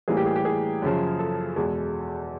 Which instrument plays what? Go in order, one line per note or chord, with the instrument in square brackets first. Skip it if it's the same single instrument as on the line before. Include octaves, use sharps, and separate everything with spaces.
[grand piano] A2 E3 G3 A#3 G#4
G4
G#4
G4
G#4
F#2 C#3 F3
A4
E2 B2 G#3